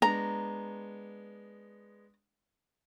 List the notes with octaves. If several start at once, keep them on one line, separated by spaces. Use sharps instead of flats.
G#3 B3 D4 A#5